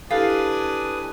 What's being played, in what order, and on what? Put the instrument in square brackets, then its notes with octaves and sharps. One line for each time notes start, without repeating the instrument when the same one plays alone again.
[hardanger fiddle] D4 [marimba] E4 G4 A4 [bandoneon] B4 G#5 D#6 [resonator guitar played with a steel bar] F5